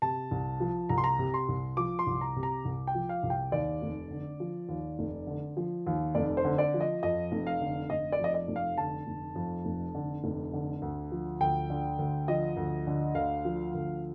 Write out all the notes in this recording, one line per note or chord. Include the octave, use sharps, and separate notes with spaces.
C3 A5
C2
F3
C2 A#5
C6
A#5
C3
C6
C2
F3 D6
C6
C2
A#5
C3
A#5
C2
G5
F3
F5
C2
G5
D#2 D5
F1
D3
F3
D#2
F1
D3
F3
D#2
F1 D5
C5
D3
D5
F3
D#5
F2 D#5
F1
F5
D3
F1 D#5
D5
F2 D#5
D5
F1
F5
D3 A5
F1
F2
F1
D3
F1
D3
D2
F3
D2 G5
D3
D2
F3 D#5
D2
D3
D2 F5
F3
D2